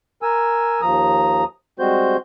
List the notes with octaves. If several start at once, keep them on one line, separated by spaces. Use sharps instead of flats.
A#4 G#5 E6
D#2 F3 A#5 D#6
G3 G#3 C4 F#4 C5 G6